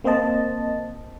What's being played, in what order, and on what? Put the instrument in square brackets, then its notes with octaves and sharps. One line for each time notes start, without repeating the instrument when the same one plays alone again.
[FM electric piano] A#3 C4 C5 D#5 A5